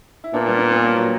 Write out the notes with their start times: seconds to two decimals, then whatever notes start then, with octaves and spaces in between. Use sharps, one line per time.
0.24 E4
0.33 A#2 B3 D4
0.46 G3 B3
0.58 B3 D4
0.71 B3 D4
0.83 A#3 C#4
0.95 F#3 A#3